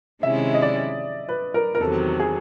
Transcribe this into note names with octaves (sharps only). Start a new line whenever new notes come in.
C3 D#3 G#3 C#4 E4 E5
D#5
D5
B4
A#4
A#4
E2 C3 D#3 F#3 A4
G#4